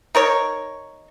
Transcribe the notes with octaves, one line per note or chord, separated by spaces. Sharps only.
D#4 A#4 C#5